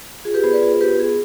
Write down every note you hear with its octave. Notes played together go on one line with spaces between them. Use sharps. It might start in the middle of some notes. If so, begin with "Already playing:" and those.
F4 G#4
G4 B4
B3 G#4 C5
B4 D5
F4 G#4 C5
B3 G4 B4
B3 G#4